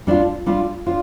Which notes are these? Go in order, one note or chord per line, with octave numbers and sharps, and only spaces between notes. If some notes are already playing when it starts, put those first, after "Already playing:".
G3 D4 F4
G3 D4 F4
D4 F4